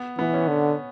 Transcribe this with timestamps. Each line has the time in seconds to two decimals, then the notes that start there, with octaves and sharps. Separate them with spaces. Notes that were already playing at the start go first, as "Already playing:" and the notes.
Already playing: B3
0.18 E3 B3
0.33 C#4
0.48 D3